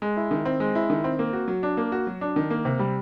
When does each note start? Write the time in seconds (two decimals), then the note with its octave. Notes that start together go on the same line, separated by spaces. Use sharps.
0.02 G#3
0.17 E4
0.31 D#3
0.45 C4
0.60 G#3
0.75 E4
0.90 D#3
1.04 C4
1.19 A#3
1.33 F#4
1.48 F#3
1.63 D4
1.77 A#3
1.92 F#4
2.07 F#3
2.21 D4
2.36 D#3
2.50 A#3
2.65 C3
2.79 G3